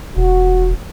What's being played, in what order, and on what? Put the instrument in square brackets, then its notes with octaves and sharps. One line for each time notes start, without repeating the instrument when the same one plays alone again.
[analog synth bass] E1 [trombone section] F#4